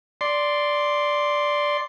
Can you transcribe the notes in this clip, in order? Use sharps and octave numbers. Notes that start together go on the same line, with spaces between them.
D5 C6